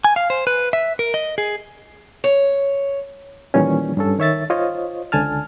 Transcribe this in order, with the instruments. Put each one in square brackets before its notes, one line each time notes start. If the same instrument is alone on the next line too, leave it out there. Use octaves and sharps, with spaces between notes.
[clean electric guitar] G#5
F5
C5
B4
E5
A#4
D#5
G#4
[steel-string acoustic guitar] C#5
[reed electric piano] A#2 D#3 E3 G3 C#4
G2 C#4 A4
D#3 C#5 E5 A6
F4 C5 C#5 D#5
C#2 D3 G#5 A5 F6